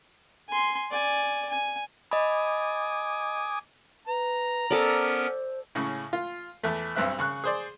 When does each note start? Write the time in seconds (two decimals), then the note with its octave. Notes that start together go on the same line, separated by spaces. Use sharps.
0.49 G#5 C6
0.91 D5 G#5
1.50 G#5
2.11 D#5 G#5 B5 D6 D#6
4.07 B4 A#5
4.71 B3 C#4 A4 A#4 C5 D5
5.75 A2 C#3 C#4
6.13 F4
6.63 E2 A3
6.96 B1 G2 C4 E5 F#6
7.19 C#3 C#6 F#6
7.44 G#4 C5 D5